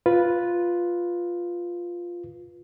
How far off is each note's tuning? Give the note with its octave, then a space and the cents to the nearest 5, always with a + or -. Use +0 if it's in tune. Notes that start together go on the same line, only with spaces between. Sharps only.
F4 +0 B4 -5